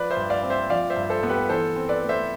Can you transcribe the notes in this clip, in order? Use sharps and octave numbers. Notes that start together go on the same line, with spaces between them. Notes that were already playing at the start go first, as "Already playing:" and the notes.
Already playing: F3 B4 D5
C5 E5
G2
D5 F5
C4
C5 E5
F3 D5 F5
C5 E5
G2
A4 C5
B3
G4 B4
E3 A4 C5
C4
B4 D5
A3
C5 E5